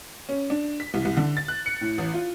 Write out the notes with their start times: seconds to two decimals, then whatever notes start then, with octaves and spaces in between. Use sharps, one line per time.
0.29 C#4
0.50 D4
0.80 B6
0.94 C2
1.05 C2
1.17 D3
1.37 A6
1.48 F#6
1.66 C#7
1.81 A2
1.98 A1
2.14 F4